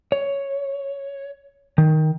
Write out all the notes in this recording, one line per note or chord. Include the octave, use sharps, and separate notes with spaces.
C#5
D#3